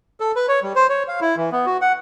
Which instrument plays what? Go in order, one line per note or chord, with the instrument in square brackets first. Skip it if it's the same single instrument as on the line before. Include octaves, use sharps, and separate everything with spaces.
[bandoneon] A4
B4
C#5
G3
C5
C#5
F5
E4
E3
B3
F#4
F#5